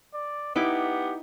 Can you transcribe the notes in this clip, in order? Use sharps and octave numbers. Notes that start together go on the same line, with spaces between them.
D5
B3 D#4 E4 G4 D6